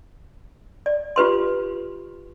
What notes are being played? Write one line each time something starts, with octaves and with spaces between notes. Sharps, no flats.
D5
F4 G4 B4 C6